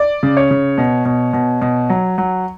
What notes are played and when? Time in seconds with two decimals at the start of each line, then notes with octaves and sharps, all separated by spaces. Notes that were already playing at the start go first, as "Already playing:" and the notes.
Already playing: D5
0.23 C#3
0.37 C#5
0.51 C#3
0.78 B2
1.05 B2
1.33 B2
1.62 B2
1.90 F#3
2.18 F#3